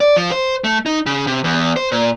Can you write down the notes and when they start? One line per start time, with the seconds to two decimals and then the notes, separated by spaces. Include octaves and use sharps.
0.01 D5
0.16 F3
0.32 C5
0.64 A3
0.86 D#4
1.06 C#3
1.27 C3
1.44 E2
1.76 C5
1.92 A#2